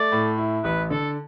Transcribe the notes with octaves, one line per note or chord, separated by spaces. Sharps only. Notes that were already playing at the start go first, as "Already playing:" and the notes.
Already playing: A3 D5
A2
E4
A1 B4
D3 A4